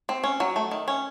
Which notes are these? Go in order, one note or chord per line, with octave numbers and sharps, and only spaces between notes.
C4
C#4
F#3
A3
D#3
C#4